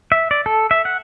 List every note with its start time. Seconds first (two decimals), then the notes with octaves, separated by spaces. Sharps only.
0.12 E5
0.31 D5
0.46 A4
0.71 E5
0.85 F#5